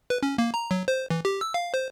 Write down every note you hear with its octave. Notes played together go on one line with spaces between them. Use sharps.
B4
C#4
A#3
A#5
F#3
C5
E3
G4
E6
F5
C5